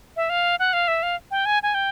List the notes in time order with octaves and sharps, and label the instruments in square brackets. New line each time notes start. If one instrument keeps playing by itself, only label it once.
[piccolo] E5
F5
F#5
F5
E5
F5
G5
G#5
G#5
G5